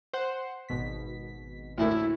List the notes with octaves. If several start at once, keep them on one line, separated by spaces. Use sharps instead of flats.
C5 F#5
G#1 B2 B6
D2 A2 A#3 E4